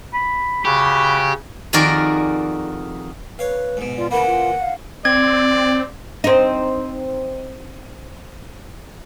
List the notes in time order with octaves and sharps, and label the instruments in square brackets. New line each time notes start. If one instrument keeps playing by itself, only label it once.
[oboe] B5
[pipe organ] C#3 [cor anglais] F#4 [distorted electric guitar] G4 [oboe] B5
[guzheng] F2 D#3 F#4 G#4 A#4 D5
[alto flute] B4 [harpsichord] C#5 F5
[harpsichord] G#2 B2
[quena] F4 [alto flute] D5
[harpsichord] C#3 E3 A#3 [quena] F#5 [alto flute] B5
[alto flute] F4
F5
[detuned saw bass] C4 [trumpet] D5 [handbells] G#6
[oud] C4 D#4